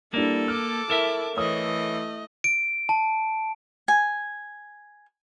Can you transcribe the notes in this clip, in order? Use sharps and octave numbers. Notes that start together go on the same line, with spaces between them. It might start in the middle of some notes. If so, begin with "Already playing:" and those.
G3 A#3 D4 E4 A4
A5 D6 F6
E4 A4 A#4 E5
E3 A3 C#5 D#5 D#6
D7
A5
G#5